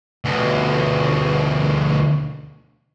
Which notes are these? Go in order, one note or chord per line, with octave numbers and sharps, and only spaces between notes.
D2 B2